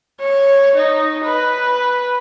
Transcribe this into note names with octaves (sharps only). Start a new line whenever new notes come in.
C#5
D#4
B4